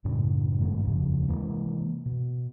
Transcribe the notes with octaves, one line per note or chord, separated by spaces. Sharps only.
F#2 A2 C#3 D4
G1 G#2 D#3 A3
F1 D#2 C#3 F3
C3 E3 G#3 A#3
B2